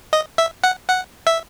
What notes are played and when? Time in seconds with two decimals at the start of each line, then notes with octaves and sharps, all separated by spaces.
0.13 D#5
0.38 E5
0.64 F#5
0.89 F#5
1.27 E5